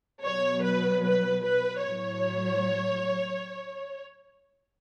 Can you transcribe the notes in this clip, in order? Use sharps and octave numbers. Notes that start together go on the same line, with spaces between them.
B2 F#3 C#5
B4
B4
B4
A2 F#3 C#5